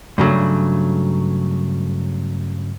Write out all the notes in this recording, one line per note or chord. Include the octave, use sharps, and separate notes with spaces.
G2 C#3 F#3 A3